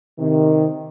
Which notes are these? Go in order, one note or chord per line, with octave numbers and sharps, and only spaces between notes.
C3 D#3